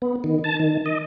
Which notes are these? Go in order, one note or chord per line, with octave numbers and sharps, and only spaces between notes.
B3
D#3
A5
D#3
D#5